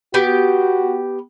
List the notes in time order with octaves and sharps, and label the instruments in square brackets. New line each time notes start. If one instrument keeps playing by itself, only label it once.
[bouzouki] B3 G4 G5 [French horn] F#4